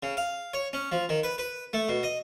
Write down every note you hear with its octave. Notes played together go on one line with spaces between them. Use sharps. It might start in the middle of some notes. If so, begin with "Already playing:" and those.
C#3
F5
C#5
C#4
F3
D#3
B4
B4
A3
B2
D#5